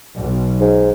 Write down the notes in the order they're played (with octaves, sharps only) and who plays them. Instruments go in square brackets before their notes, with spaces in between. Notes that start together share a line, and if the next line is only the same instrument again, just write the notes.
[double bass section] B1
[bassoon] G#2